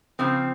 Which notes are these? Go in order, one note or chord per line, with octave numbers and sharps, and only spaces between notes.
C#3 F3 C4